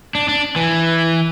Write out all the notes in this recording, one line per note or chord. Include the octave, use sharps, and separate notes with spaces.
D4
D4
E3